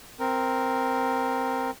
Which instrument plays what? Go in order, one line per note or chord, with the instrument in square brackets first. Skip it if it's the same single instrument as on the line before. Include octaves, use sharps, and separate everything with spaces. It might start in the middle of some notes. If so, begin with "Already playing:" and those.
[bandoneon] C4 A#4